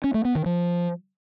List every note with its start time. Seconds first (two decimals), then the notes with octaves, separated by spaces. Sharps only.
0.04 C#4
0.14 A3
0.25 B3
0.35 D#3
0.46 F3